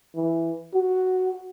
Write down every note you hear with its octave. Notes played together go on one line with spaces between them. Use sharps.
E3
F#4